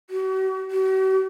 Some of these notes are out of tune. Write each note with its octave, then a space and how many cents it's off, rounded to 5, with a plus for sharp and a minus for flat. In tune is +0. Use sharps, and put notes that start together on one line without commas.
F#4 +40
F#4 +45